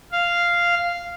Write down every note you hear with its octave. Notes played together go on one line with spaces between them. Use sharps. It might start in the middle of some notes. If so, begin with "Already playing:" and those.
F5